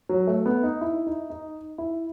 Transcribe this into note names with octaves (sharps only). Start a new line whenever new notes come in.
F#3
A3
B3
D#4
E4
D#4
D#4
E4